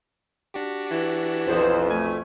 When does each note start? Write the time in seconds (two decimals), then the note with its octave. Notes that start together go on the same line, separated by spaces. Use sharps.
0.54 D4 F#4 G4
0.91 E3
1.48 B1 F2 B3 C5
1.91 A3 G#5